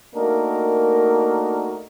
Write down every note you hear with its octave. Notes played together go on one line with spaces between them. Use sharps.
A3 A#3 D4 D#4 F#4 A#4